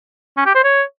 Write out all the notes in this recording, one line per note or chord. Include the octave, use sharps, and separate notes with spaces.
C#4
G4
C5
C#5